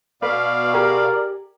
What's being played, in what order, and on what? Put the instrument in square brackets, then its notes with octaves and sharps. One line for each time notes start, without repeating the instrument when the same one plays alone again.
[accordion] B2 F5 [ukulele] B4 [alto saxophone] D5
[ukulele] G4 G#4 [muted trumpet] A#4